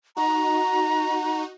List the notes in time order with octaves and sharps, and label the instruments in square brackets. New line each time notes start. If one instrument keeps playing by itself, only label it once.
[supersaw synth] D#4 F#4 [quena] A#5